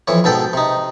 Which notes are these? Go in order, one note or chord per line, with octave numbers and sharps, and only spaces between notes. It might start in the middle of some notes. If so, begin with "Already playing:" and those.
F2 E3 C#5
G#2 B2 A4 G5
C3 D#4